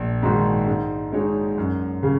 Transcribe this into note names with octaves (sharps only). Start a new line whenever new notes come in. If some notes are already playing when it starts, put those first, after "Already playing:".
Already playing: A#1
G#2 D#3 G#3 F#4
G#2
G#3 D#4 F#4 C#5
F#2
C#3